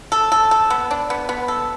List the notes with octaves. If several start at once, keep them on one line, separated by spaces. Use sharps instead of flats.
A4
A4
A4
B3
D4
B3
B3
A4